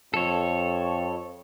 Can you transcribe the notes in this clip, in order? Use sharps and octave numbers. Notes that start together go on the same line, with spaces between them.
F2 A4 C#5